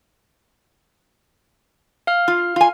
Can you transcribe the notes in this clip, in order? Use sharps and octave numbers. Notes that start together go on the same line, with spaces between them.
F5 F6
F4
F4 G#5